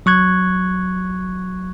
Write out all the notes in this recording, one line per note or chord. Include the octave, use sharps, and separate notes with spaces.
F#3 C#6 F#6 G#6